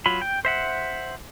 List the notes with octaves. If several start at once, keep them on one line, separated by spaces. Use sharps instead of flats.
F#3 F4 B5
G5
C5 E5 F#5